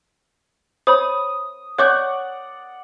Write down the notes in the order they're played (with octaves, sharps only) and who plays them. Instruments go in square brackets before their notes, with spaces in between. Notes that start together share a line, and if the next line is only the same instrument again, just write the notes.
[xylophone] C5 C#5 B5 [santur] D#6
[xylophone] C#5 C#6 G6 [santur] D5 F#5